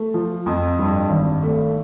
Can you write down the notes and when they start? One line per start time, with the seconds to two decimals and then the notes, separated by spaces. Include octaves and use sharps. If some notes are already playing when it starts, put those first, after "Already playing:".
Already playing: A3
0.14 F3
0.46 F2
0.79 G2
1.10 G#1
1.43 A3